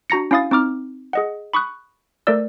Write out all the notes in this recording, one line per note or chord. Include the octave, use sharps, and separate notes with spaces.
D4 F#4 A#5 A#6 C#7
C#4 E4 F5 D#6 A6
C4 D#4 D6 F6
G#4 D#5 F#5
B5 C#6 D#6 F#6
A3 A4 A#4 C5 D5 E6